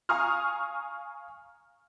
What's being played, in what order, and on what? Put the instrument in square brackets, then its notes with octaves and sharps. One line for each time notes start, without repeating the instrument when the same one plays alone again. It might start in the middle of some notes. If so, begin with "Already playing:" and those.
[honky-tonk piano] F5 G#5 A#5 C#6 D#6 F6